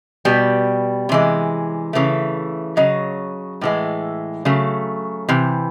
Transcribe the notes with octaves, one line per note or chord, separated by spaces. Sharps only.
B2 G3
C3 E3 G#3
C#3 E3 A3
C#3 F#3 D#5
A2 E3 G#3
C#3 F#3 A3
C3 E3